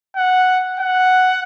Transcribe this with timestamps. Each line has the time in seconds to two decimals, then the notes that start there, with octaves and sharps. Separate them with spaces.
0.16 F#5
0.80 F#5